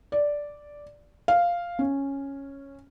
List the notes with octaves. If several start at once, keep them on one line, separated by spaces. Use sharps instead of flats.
D5
F5
C#4